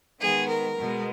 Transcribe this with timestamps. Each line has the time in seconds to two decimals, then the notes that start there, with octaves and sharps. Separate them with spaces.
0.20 D#3 G#3 B3 G#4
0.48 A#4
0.77 B2 G#3 B3